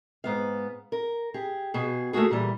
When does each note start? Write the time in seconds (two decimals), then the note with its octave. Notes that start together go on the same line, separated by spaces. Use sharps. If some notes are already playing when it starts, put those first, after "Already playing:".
0.24 G#2 B3 F5
0.92 A#4
1.34 G4 G#4
1.74 B2 G#4
2.13 A3 A#3 F4 F#4 G#4
2.31 A#2 E3 G3